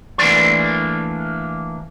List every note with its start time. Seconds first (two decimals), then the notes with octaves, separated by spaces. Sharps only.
0.18 E3 A3 A#3 D4 D5 C6